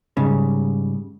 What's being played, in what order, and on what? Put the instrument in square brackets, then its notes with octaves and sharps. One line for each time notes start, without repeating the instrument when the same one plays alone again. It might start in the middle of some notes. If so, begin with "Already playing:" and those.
[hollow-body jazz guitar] G#2 C#3 G3